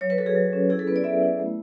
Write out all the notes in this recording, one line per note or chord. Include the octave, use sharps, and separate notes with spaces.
F#3 C#5
B4
F#4 A4
G#4
F#3
C#4
E4 G#4
A4
B3 B4
D5
B3 E5
E4
A3